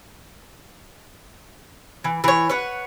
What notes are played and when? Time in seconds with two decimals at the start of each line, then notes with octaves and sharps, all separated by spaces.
2.04 E3
2.24 E3 C#5
2.50 B4 C#5 F#5